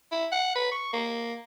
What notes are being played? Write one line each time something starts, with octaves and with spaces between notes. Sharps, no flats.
E4
F#5
B4
C#6
A#3